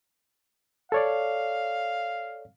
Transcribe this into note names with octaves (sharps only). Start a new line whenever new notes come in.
A4 C#5 D5 F5